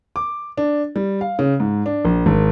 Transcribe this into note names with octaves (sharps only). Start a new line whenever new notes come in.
D6
D4
G3
F5
C#3
G#2
D4
A#1
G#1